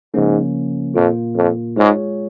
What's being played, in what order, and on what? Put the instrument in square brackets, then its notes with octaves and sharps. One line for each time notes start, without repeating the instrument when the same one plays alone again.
[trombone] G#2 [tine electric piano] C#3 F3 A#3 C#4
[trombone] F2 [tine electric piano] A#2 A#3 F4
[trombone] F2
[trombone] G#2 [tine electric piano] G#3 F4 G#4 C#5